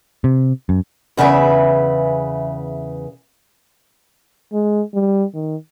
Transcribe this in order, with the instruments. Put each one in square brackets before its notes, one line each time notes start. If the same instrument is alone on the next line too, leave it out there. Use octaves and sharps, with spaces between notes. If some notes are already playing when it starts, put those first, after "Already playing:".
[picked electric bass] C3
F#2
[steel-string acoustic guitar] E2 C#3 B4 E5
[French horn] G#3
G3
D#3